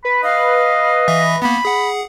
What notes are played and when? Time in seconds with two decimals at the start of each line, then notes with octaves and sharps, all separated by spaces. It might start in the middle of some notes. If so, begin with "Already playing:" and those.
0.05 B4 B5
0.23 D#5 F5
1.08 E3 E5 A#6
1.42 A#3 B3 B5
1.65 G#4 F#5